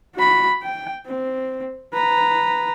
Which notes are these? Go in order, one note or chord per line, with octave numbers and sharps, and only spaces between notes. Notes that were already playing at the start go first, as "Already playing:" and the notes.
F#4 B5
G5
C4
B4 A#5